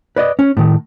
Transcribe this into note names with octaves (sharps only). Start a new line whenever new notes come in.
B4 D5 D#5
C#4
A2 D#3